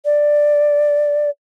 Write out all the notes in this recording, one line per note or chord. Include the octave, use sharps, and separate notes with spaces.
D5